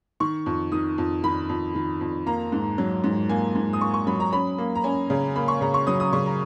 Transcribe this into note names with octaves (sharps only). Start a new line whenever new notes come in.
D#3 C#6
F2
D#3 D#6
F2
D#3 B5
F2
D#3
F2
A#3 A#5
G#2
F#3
G#2
A#3 G#5
G#2
D#6
A#3 C#6
C#6
F#3 B5
A#5
C#4 B5
A#3
A#5
C#4 G#5
C#3
A#3 B5
C#6
C#3 A#5
C#6
F#3 D#6
D#6
C#3 C#6
A#5